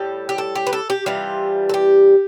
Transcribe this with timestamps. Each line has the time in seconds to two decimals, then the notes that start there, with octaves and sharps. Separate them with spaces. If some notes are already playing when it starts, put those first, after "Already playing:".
Already playing: A2 G3 A4
0.29 G4
0.38 A4
0.55 G4
0.67 B4
0.73 A4
0.90 G4
1.06 C3 E3 G3 F4
1.69 A4
1.74 G4